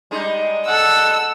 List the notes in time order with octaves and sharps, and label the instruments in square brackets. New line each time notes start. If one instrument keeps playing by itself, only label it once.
[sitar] G3 G#3 D#4
[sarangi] A4 [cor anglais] F#5 [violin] E6